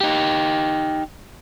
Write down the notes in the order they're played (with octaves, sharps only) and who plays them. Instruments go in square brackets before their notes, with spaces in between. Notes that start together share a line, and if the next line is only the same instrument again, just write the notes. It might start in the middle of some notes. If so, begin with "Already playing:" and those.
[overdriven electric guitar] D#4 G4